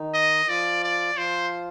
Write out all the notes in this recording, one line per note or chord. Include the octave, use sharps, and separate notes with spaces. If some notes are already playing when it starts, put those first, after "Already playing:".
Already playing: D#3 D#4
D#5
F3 F4 D5
D5
F3 F4 C5